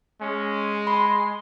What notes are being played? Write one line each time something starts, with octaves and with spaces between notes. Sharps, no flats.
G#3 C#4
B5 C6